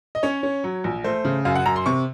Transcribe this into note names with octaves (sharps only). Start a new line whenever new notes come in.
D#5
C#4 C#5
C#4
F#3
A#1
A3 C5
C#3
F#2 F5
F#5
F#2 A#5
C6
C3 C#6